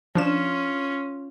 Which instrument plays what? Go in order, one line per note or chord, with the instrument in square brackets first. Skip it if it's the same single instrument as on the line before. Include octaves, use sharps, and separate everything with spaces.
[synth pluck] F3 D4 E7 [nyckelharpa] C#4 F4